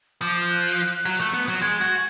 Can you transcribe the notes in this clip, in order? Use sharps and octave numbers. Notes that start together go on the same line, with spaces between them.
F3 D6
F6
F#6
F#3
A3
B3
F#3
G#3 G#6
F#4